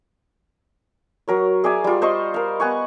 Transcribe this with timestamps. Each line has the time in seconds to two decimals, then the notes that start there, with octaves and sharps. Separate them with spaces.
1.28 F#3 A#4 C#5
1.64 G#4 D5 E5 G#5
1.84 G3 F4
2.02 C5 D#5 C6 C#6
2.34 A#4 F5
2.60 B3 F#5 G#5 C#6